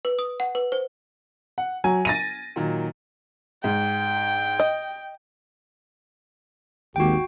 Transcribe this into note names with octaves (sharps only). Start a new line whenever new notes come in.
B4
D#6
F#5
B4
C5
F#5
F#3 G#5
A6 A#6 D#7
A#2 D#3 F#3
G#2 G5
D#5
G#1 D#2 F#4 G4 G5